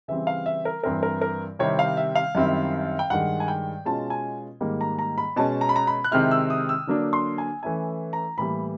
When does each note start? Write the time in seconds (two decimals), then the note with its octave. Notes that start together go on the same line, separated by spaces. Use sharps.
0.08 C#3 E3 G3 C4 E5
0.27 F5
0.46 E5
0.65 A#4
0.84 G2 E3 G3 C4 E4 A#4
1.03 A#4
1.21 A#4
1.59 C3 D#3 G3 C4 E4 C#5
1.79 F5
1.97 E5
2.15 F5
2.35 F#2 D#3 G3 C4 E4
2.99 G5
3.10 G2 D#3 G#3 F#5
3.40 G#5
3.48 G5
3.85 B2 G#3 C#4 F4 A5
4.10 G#5
4.61 G#2 D#3 G3 A#3
4.81 A#5
4.99 A#5
5.18 B5
5.36 B2 G#3 C#4 A5
5.61 A#5
5.69 B5
5.76 A#5
5.87 B5
6.04 F#6
6.11 C3 D#3 G#3 C4 E4 F6
6.31 E6
6.50 D#6
6.69 E6
6.87 D3 F#3 A#3 D4
7.13 C6
7.38 G#5
7.63 E3 A3 C#4 E4 G#5
8.13 A#5
8.38 A2 E3 G3 A#3 B5